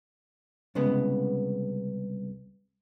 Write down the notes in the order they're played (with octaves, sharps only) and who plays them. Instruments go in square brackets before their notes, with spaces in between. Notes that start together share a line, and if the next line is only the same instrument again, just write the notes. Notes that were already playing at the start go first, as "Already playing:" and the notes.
[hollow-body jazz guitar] C2 C#3 G#3 B3